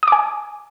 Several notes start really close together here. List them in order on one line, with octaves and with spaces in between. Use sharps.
D#6 D6 G#5